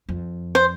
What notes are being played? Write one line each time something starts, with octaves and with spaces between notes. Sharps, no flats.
F2
C5